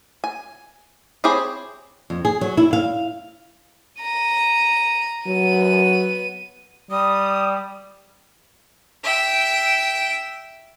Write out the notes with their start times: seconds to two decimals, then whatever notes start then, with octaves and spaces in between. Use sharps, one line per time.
0.24 G#5
1.24 C4 E4 G4 G#4 C#5
2.10 F2
2.25 G#4
2.41 F#3
2.57 E4
2.73 F5
4.02 A#5 D#7
5.26 F#3 B3 D#7
6.91 G3 D#6
9.03 E5 G5